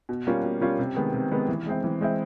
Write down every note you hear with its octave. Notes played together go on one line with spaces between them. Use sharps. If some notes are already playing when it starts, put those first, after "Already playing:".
B2
G3 A#3 C#4 F4
B2
G3 A#3 C#4 F4
C3
D#3 G#3 B3
C3
D#3 G#3 B3
E3
G#3 C4 E4
E3
G#3 C4 E4